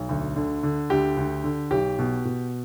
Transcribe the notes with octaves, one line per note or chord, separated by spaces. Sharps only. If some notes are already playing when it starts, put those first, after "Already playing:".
Already playing: B1
D2
D3
D3
D2 G4
D2
D3
B1 G4
B2
B2